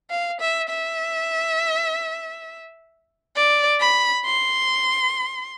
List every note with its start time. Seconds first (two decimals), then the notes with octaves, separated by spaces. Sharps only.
0.10 F5
0.41 E5
0.70 E5
3.36 D5
3.80 B5
4.25 C6